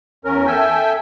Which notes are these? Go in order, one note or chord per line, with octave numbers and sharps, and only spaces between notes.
E2 C#4 A#4
A4 E5 G5 G#5